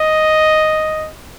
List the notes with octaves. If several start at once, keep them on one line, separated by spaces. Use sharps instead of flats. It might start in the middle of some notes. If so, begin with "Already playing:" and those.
Already playing: D#5